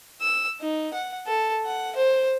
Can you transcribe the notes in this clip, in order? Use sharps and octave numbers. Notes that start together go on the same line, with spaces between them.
E6
D#4
F#5
A4
F#5
C5